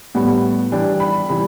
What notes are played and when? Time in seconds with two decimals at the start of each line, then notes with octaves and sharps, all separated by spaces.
0.15 A2 G3 B3 F#5
0.72 E3 G3 D4 G5
1.00 B5
1.29 C3 E3 G3 B5